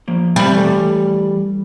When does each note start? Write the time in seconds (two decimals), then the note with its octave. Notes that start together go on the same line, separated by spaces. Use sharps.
0.08 F3 A#3
0.36 G3 C4 B5
0.52 E3 A3 A4